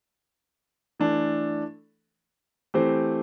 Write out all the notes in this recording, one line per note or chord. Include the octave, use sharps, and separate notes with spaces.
E3 A3 D4 A4
E3 A3 C4 G4 C5